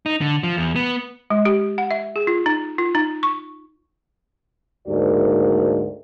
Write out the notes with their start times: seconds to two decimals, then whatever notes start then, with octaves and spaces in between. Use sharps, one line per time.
0.06 D#4
0.21 D3
0.43 F3
0.57 E2
0.76 B3
1.30 G#3
1.45 G4
1.78 F#5
1.91 E5
2.16 G#4
2.27 F4
2.46 D#4
2.78 F4
2.95 D#4
3.23 C#6
4.88 D2 G#2 A#3 F#4 A#4 D5